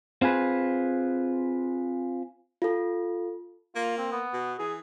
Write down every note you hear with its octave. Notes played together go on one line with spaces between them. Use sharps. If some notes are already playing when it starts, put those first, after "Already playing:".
C4 F4 G#4 B4
F4 A4
A#3 F4
C4
B3
B2
E3 G#4